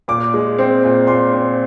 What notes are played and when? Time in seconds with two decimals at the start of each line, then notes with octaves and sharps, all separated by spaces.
0.08 A#2 D6
0.34 G#3
0.58 C4
0.84 A#2
1.07 A#2 C6
1.33 C4